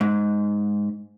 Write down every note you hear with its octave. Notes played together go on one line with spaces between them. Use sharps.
G#2